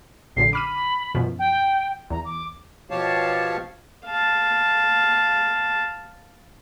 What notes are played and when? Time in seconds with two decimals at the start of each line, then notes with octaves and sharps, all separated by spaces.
0.36 A#1 F#2 D3 C7
0.53 B5 D6 F6 D#7
1.15 F#2 B2 F3
1.39 G5
2.10 E2 A#5
2.25 D6
2.91 B2 F3 G4 C#5 F5 A5
4.06 F5 A5